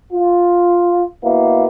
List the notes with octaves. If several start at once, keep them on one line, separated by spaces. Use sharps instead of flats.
F4
B2 A#3 E4